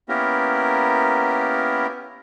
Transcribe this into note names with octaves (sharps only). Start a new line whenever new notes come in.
A#3 B3 C#4 E4 G4 A#4